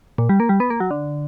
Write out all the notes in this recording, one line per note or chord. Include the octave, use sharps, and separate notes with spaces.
A#2
G3
A#3
G3
B3
A#3
F#3
D3